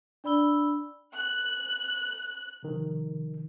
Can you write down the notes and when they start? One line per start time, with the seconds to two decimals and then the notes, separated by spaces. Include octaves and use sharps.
0.24 D4 D5 B5 E6 G7
1.14 F#6
2.63 C3 D#3 F3